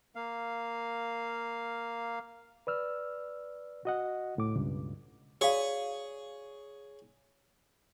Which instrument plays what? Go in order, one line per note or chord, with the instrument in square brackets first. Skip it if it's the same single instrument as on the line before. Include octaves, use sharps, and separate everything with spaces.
[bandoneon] A#3 F5
[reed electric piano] B4 D5 E6 F6
F#4 D#5 F#5
C#2 A2 D6
C#2 G2 B2
[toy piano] F#4 D5 F5 [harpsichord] G#4 C#5 C#6